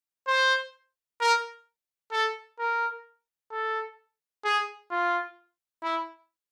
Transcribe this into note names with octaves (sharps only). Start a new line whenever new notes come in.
C5
A#4
A4
A#4
A4
G#4
F4
E4